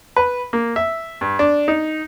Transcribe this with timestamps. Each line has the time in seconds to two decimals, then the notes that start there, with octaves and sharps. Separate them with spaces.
0.16 B4
0.53 A#3
0.76 E5
1.21 G2
1.39 D4
1.68 D#4